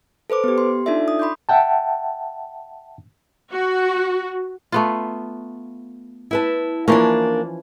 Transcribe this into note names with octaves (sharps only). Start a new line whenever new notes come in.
A4 B4 C5 D6
B3 G4
C6
D4 D#4 F4 A4 D5 E5
D#6
B5 C6 D6 G6
E5 F#5 G5 A5
F#4
A3 B3 F4
E4 B4 A5
E3 F3 A#3 C#4 D4